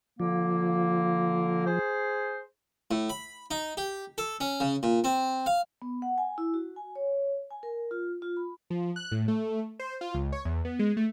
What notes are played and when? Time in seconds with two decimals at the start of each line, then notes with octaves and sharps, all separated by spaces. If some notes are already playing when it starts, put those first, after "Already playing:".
0.20 D3 F3 A#3
1.67 G#4 C5
2.91 A2
3.10 B5
3.51 D#4
3.77 G4
4.18 A4
4.41 C#4
4.60 C#3
4.83 A#2
5.04 C4
5.46 F5
5.82 B3
6.02 F#5
6.18 G#5
6.38 E4
6.54 F#4
6.76 G#5
6.96 C#5
7.51 G#5
7.63 A#4
7.91 F4
8.22 F4
8.37 B5
8.70 F3
8.96 F#6
9.12 A2
9.28 A3
9.79 C5
10.01 F4
10.14 C#2
10.32 C#5
10.45 E2
10.65 B3
10.79 G#3
10.97 A3